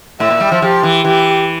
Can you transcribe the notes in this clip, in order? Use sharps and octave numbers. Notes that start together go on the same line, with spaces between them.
A2 E5
A#2
G3
F3
F3 G4
E3
E3 G4